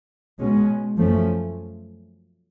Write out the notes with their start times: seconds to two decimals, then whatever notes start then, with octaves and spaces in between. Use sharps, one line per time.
0.39 B2 G#3 C#4
0.96 F#2 F3 A3 C#4